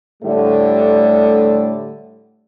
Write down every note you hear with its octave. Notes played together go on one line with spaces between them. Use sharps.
A2 D3 G3 A3